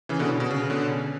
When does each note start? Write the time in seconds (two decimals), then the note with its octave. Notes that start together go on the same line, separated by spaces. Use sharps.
0.09 C#3 E3
0.19 B2 D3
0.29 C#3
0.40 B2
0.51 C#3
0.70 B2 D3
0.90 C#3